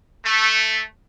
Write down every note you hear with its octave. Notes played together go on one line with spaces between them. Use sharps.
A3